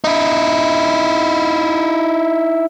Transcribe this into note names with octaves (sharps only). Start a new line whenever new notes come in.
D#4 E4